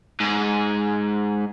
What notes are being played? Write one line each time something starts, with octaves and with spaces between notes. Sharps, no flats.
G#2 G#4